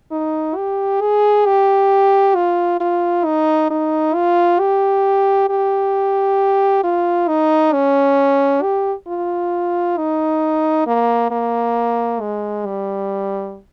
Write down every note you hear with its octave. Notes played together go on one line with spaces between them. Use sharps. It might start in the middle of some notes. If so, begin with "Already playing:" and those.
D#4
G4
G#4
G4
F4
F4
D#4
D#4
F4
G4
G4
F4
D#4
C#4
G4
F4
D#4
A#3
A#3
G#3
G3